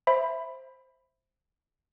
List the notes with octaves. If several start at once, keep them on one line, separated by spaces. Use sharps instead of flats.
C5 E5 B5